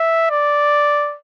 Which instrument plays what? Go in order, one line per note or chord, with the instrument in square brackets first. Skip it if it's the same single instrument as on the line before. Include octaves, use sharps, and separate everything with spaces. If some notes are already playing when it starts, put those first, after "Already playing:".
Already playing: [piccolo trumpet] E5
D5